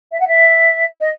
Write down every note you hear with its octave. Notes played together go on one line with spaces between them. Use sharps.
E5
F#5
E5
D#5